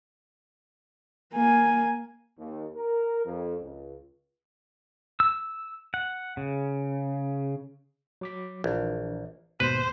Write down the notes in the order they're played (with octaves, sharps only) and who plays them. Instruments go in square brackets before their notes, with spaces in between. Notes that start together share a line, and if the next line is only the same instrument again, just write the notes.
[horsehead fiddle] A#3 G#5
[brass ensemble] D#2
A#4
F2
C#2
[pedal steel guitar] E6
F#5
C#3
[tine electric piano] F#3 D6 B6
[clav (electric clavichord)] A#1 [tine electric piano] E3 D4
[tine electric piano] D#2 [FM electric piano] G#2 B2 [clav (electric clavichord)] B4 [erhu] C5